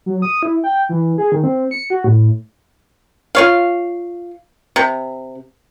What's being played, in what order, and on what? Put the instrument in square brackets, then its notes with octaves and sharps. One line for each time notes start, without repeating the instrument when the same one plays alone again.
[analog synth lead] F#3
D#6
E4
G5
E3
G#4
D#3
C4
C#7
F#4
A2
[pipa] F4 C#5 F5
C3